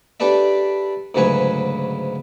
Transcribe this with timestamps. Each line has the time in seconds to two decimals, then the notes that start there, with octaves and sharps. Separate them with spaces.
0.20 D4 G4 A4 B4 D5 E5
1.15 D2 G#2 C#3 F#3 B4 G#5